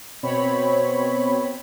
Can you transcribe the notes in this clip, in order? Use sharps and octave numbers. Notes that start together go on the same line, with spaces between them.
B2 C4 C#5 B5